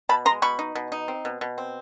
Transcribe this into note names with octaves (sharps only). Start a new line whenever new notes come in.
B2 A5 B5
G#3 A#5 C6
B2 B5 C#6
D#4
B2
D#4
C4
B2
B2
C4